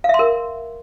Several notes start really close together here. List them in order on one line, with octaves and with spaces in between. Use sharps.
F5 E5 C6 A#4